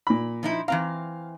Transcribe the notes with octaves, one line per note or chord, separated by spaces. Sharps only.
A#2 B5
F3 D#4 E4
E3 C4 F5 A#5